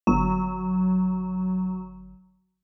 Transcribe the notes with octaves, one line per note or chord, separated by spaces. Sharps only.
G1 F#3